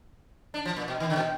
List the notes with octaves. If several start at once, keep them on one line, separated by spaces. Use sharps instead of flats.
D4
F3
A#2
B2
D#3
D3
B2